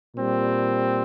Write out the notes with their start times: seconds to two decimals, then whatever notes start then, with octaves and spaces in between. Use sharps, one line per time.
0.14 A#2 G3 C4